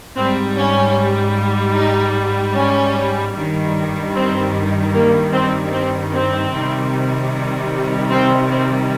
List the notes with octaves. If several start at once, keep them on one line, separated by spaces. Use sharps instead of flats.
G#2 G3 C4
C#4
D#4
C#4
G2 D#3 G3
C4
A#3
C4
C4
C4
C3 D#3 G3
C4
C4